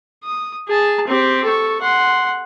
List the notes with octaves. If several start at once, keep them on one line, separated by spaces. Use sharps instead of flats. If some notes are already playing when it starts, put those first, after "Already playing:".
D#6
G#4 A5
C4 G4
A4 C#6
F#5 C6